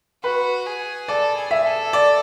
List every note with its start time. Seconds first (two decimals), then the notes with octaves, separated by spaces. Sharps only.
0.23 F#4 B4
0.67 G#4
1.08 A4 D5
1.37 G#4
1.51 E5
1.66 A4
1.93 D5